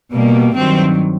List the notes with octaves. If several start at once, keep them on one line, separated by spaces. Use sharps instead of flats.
B2 G3 A#3
G2 D#3 F#3 C4